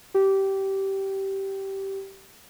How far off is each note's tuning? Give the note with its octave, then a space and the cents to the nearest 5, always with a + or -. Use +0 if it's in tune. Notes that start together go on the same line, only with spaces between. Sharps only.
G4 -15